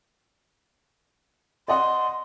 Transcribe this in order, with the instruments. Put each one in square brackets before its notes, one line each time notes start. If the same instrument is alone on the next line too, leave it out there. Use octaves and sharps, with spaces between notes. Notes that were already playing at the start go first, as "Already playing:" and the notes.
[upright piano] D5 D#5 F#5 [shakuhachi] C6